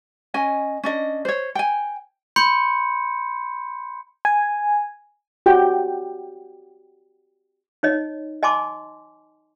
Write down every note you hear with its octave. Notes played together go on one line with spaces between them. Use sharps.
C#4 D#5 G#5
C#4 D4 D#5
C5 C#5
G5 G#5
B5 C6 G6 C#7
G#5
F#4 G4 G5
D#4 C#5 D#5
D#5 G#5 A5 C6 D6